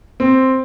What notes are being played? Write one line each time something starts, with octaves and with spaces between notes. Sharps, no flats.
C4